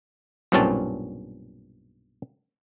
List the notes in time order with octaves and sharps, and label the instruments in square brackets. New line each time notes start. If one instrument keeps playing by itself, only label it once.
[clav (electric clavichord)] B1 G2 A#2 C4 C#4 A5